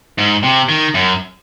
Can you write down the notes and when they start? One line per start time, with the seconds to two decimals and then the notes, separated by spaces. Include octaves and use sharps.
0.18 G#2
0.43 C3
0.69 D#3
0.94 F#2